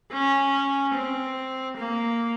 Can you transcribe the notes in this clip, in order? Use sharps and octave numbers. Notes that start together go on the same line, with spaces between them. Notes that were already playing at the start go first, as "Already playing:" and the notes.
C#4
C4
A#3